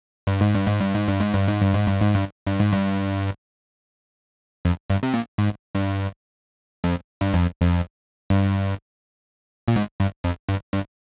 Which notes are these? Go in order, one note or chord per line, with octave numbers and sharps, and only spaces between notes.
G2
G#2
G2
G#2
G2
G#2
G2
G#2
G2
G#2
G2
G#2
G2
G#2
G2
G2
G#2
G2
F2
G2
C3
A#2
G#2
G2
F2
G2
F2
F2
G2
A#2
G#2
G2
F2
G2
G2